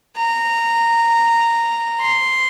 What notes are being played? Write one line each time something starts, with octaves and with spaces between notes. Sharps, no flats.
A#5
C6